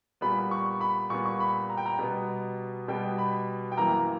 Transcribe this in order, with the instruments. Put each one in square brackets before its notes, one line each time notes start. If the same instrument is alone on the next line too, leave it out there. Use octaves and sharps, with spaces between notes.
[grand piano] A#2 G3 B3 B5
C#6
B5
A#2 G3 B3 C#6
C#6
B5
A#5
G5
A#5
B2 G3 B3
B2 G3 B3 G5
B5
G5
F#2 E3 A#3 A#5